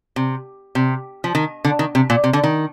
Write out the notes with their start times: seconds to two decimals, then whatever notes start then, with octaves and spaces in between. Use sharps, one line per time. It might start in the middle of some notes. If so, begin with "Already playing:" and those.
0.16 C3
0.75 C3
1.24 F3
1.35 D#3
1.65 D3
1.79 D#3
1.95 C3
2.10 A#2
2.24 C3
2.33 D3
2.44 D#3